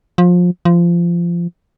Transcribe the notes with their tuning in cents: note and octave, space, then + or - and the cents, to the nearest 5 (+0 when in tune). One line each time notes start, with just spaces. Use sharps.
F3 +25
F3 -20